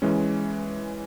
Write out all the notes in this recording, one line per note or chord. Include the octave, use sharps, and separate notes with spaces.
E3 G#3 C#4